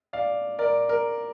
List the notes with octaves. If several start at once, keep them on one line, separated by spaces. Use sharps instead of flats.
D5 F5
A#4 D5
A#4